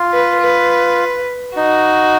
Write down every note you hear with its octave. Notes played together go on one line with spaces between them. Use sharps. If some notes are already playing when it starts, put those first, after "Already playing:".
Already playing: F4
B4
B4
D#4 F#4